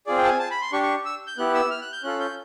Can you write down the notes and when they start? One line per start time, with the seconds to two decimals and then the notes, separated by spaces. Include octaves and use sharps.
0.07 C4 F4 G#4 D5
0.18 G5
0.25 A5
0.28 G#5
0.39 A5
0.51 B5
0.61 C6
0.72 D4 G4 C#6
0.83 C#6
1.05 E6
1.27 G6
1.38 B3 E4 G4 F#6
1.55 E6
1.71 F6
1.82 F#6
1.92 G6
2.03 C#4 F4 A4 F#6
2.20 G6